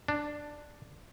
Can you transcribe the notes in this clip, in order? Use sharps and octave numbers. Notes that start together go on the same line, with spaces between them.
D4